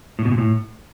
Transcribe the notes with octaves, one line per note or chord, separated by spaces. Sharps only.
A2
B2
A#2
A2